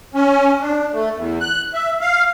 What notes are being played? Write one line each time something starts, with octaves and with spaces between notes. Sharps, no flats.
C#4
D4
A3
E2
F#6
E5
F5